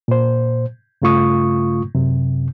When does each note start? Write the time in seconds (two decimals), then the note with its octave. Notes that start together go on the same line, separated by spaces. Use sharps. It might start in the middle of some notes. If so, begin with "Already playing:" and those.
0.08 A#2 C5
1.02 G2 C#3 A3 F4 C#6 D#6
1.95 F#2 C3